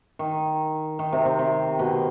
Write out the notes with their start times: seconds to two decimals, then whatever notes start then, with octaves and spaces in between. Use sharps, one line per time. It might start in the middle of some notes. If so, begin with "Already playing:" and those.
0.19 D#3
0.99 D#3
1.13 C3
1.26 C3
1.39 C3
1.79 B2